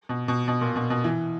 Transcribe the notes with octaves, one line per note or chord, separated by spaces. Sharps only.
B2
B2
B2
A#2
B2
B2
E3